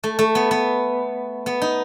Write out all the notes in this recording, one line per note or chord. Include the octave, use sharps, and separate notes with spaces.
A3
A3
B3
B3
B3
D#4